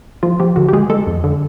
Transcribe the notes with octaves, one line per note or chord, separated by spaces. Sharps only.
F3 F4
F3 G4
D3 F#4
G4
G#3 G#4
G#3 A4
F2
D3